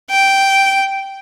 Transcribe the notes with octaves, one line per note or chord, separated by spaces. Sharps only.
G5